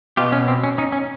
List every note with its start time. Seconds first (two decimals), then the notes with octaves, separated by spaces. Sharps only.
0.17 B2 F4 G4
0.32 C#4
0.48 C4
0.64 C#4
0.78 C#4 D#4
0.92 C#4